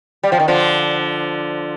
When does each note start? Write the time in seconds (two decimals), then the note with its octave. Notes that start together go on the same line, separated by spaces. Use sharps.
0.23 G3
0.32 F3
0.40 D#3
0.48 D3 F3